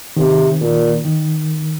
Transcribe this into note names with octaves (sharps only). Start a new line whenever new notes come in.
C3 D#3
A#2
D#3